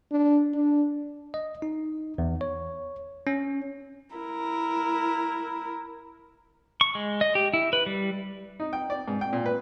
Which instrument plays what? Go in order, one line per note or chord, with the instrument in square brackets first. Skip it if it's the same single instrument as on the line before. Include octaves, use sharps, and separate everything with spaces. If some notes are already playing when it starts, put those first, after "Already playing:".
[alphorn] D4
D4
[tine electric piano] D#5
D#4
E2
C#5
C#4
[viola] E4 A#4
[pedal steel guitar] C#6
G#3
D#5
G4
E4
B4
G3
[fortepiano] D#4
G5
D5
G#2
G5
A#2
B4